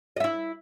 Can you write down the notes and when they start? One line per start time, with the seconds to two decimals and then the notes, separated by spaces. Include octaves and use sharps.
0.17 D#5
0.20 E5
0.24 E4